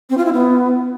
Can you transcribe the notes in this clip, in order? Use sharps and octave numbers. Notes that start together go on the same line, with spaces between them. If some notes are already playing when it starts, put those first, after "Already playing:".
C4
F4
E4
B3